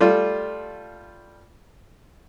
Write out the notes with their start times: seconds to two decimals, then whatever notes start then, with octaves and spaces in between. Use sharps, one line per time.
0.01 G3 A3 F4